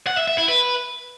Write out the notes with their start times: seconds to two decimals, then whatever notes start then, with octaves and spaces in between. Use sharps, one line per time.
0.07 F#5
0.17 E5
0.28 E5
0.38 E4
0.48 B4